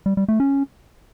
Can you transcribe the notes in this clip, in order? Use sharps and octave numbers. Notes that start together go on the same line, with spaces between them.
G3
G3
A3
C#4